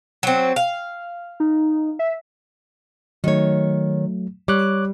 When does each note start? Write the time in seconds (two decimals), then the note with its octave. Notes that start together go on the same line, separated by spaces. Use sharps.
0.23 F#3 C4
0.56 F5
1.40 D#4
1.99 E5
3.24 D#3 F#3 A3 C#5
4.48 G3 C#5 D6 F#6